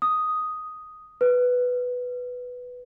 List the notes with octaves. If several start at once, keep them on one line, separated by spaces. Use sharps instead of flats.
D#6
B4